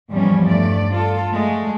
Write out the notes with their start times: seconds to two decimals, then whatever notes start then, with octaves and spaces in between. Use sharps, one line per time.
0.11 E2 G#2 F3 G3 C#4
0.46 G2 A3 D5
0.92 F4 A4
1.33 G#3 A3